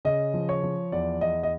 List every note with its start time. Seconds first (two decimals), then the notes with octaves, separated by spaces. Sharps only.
0.05 C#3 D#5
0.34 F3
0.49 C#5
0.63 F3
0.92 E2 D5
1.21 E2 D#5
1.43 D#5